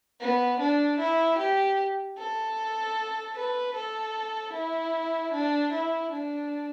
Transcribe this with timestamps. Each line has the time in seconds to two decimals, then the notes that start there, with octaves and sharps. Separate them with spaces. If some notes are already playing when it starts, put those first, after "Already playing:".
0.20 B3
0.60 D4
1.00 E4
1.38 G4
2.18 A4
3.36 B4
3.75 A4
4.54 E4
5.33 D4
5.73 E4
6.12 D4